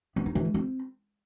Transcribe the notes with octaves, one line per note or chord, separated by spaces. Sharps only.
B3
D#4
E3
G#3
C4